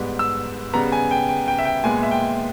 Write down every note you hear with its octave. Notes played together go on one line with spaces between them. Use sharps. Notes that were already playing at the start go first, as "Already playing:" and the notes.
Already playing: G#2 G3 B3
E6
C#3 G3 B3 A#5
G#5
G5
G5
G5
E5
G5
A#2 G#3 B3 G#5
E5
G5